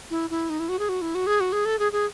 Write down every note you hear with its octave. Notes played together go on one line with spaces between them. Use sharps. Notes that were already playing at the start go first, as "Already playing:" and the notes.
E4
E4
D#4
E4
F#4
G#4
F#4
E4
F#4
G#4
F#4
G#4
A4
G#4
G#4